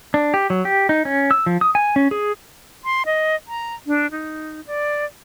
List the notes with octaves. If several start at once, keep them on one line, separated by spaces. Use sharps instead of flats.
D4
G4
F#3
G4
D#4
C#4
E6
F3
D#6
G#5
C#4
G#4
C6
D#5
A#5
D4
D#4
D5